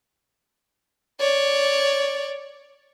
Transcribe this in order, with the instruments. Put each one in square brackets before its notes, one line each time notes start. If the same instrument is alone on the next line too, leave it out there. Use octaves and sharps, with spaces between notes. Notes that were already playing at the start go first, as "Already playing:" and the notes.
[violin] C#5 D5